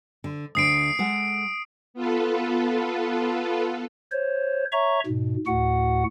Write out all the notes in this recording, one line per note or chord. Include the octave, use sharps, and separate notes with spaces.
D3
D2 D3 D4 D#6 C7 D7
G#3 A4 F#5
B3 F4 A4 B4
C5 C#5
C#5 E5 A#5 C#6
G#2 B2
D2 A2 F#4 F#5